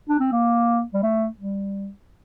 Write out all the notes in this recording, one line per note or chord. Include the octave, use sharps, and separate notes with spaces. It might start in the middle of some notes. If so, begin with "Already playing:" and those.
D4
C4
A#3
G3
A3
G3